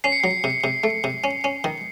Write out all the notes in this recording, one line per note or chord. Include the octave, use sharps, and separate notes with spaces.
C#4 C7
C#7
F#3 C7
C3
C3
A3
C3
C#4
C#4
D#3